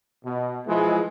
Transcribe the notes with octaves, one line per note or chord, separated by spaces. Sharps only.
B2
E3 F3 G#3